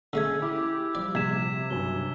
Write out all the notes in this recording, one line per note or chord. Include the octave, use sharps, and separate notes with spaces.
D3 G#3 A3 C#4 E6 G#6
E4 G4
F3 G3 D5
A#1 C3 G#6 B6 E7
B1 G2 G#5 G7